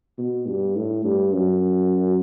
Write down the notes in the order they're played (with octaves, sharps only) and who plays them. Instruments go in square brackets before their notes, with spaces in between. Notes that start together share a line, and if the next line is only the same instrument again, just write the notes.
[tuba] B2
G2
A2
G2
F#2